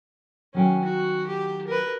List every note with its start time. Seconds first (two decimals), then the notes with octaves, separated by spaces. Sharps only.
0.54 D#3 F#3 C#4 G5
0.85 F#4
1.27 G4
1.68 A#4 B4